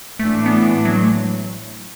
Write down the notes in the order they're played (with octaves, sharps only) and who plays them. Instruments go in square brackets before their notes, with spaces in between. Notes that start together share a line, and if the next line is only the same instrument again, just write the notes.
[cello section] A2 E3 D4 [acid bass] A3
[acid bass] B3
A3
F#3
A3
F#3